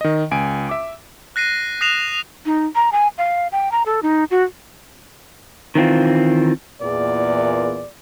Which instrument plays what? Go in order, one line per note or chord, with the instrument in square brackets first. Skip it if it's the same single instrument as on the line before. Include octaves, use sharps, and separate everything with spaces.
[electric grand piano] D#3 D#5
C#2 G#5 D7
E5 D6
[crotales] F#6 A#6 C7 D#7
D#6 F#6 A#6 C7 E7 F7
[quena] D#4
A#5
G#5
F5
G5
A#5
A4
D#4
F#4
[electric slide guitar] D#3 E3 C4 F4
[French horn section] E2 A#2 [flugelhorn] D5